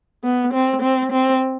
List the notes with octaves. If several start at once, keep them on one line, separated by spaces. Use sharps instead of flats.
B3
C4
C4
C4